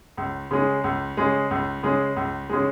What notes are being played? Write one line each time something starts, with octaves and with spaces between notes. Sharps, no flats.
C#2
C#3 G#3
C#2
C#3 G#3
C#2
C#3 G#3
C#2
C#3 G#3